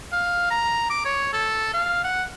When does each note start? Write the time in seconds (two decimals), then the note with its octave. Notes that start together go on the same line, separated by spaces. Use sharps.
0.12 F5
0.51 A#5
0.90 D6
1.05 C#5
1.34 A4
1.74 F5
2.04 F#5